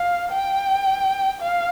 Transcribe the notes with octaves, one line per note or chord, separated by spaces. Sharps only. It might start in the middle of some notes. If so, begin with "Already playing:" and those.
Already playing: F5
G5
F5